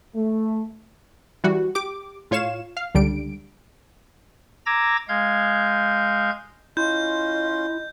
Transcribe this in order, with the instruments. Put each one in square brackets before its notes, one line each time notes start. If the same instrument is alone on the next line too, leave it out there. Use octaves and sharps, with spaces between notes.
[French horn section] A3
[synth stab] E3 G3 F#4
G4 D6
A2 F4 C#5 F5 E7
F5
C#2 D3 G3 D7
[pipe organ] A#5 D6 E6 G#6 A#6
G#3 F5 G6 G#6
[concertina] C#4 F4 C6 [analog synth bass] E4 [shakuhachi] D#5 [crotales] G6